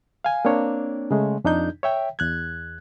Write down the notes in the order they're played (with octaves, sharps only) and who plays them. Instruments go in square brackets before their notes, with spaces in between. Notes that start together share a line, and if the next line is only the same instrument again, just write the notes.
[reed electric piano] F5 G#5
A#3 C4 D4 C#5
C#3 G#3 A3
F2 D4 D#4 G6
C#5 E5 G5
E2 F#6 G#6